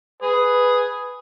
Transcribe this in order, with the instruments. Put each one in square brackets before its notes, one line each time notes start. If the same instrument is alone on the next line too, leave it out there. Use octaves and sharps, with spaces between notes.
[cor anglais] G#4 [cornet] B4